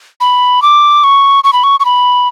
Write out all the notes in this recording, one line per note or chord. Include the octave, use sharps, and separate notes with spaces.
B5
D6
C#6
C#6
B5
C#6
C#6
B5